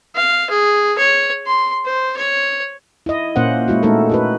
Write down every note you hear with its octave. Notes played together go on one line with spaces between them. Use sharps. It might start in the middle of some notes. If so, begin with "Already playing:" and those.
F5
G#4
C#5
C6
C5
C#5
E4 D#5
A#2 A#3 C#4 C5 F#5
G#3 E4 F#4
G#3 A3 D#4 A4 A#4
E4 F#4 B4